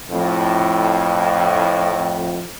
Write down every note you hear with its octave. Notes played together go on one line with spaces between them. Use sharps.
F2 A2